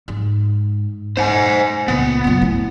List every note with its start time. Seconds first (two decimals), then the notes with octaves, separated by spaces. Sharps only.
0.08 G#2
1.17 D#4 C5 F#5 G#5
1.88 C#2 A#2 B3
2.24 F#2 A#2
2.42 A2